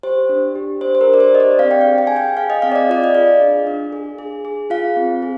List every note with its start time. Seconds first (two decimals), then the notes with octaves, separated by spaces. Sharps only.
0.03 G4 C5
0.29 D4
0.55 G4
0.81 D4 C5
0.95 C5
1.01 A#4
1.08 D4
1.14 D5
1.20 C5
1.33 G4 D#5
1.40 D5
1.59 C4 F5
1.71 G5
1.81 F5
1.85 G#4
1.98 G5
2.07 G#4 G#5
2.16 G5
2.37 G#4 F5
2.50 D#5
2.62 C4 F5
2.72 D5
2.76 D#5
2.89 F4 D5
3.04 D#5
3.15 G#4 F5
3.41 D4
3.67 D4
3.93 G#4
4.19 G#4
4.45 G#4
4.70 F4 F5
4.97 C4
5.22 G#4